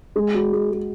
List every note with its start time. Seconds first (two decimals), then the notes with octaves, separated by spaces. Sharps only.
0.16 G#3
0.34 F#4
0.53 G#3
0.71 G#3